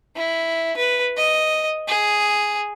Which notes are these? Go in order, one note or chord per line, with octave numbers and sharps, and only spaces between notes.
E4
B4
D#5
G#4